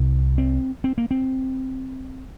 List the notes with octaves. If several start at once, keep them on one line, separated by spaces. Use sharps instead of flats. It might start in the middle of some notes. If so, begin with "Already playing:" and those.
Already playing: C2 C3
C4
C4
A#3
C4